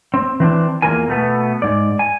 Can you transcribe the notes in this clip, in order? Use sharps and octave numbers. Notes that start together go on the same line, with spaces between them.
C4
E3 C4 D4
E2 E3 A#3 F4 A#4 G#5
B2 A3 B3
G#2 D5
G#5